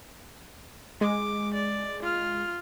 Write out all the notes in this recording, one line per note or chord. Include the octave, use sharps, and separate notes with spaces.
G#3 D6
D5
F4 F6